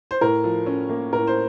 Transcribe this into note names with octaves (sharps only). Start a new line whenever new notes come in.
C5
A2 A#4
F3
C#4
A#3
A2 A#4
C5